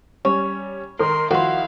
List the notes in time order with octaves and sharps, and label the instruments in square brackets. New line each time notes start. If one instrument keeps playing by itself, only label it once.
[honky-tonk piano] G3 C#4 [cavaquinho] C#5
[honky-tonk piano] D#3 A#4 [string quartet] C6
[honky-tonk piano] D#3 F3 [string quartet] E4 F5 [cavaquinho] F#4 C6